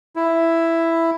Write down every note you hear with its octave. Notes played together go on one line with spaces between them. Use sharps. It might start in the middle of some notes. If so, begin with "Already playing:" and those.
E4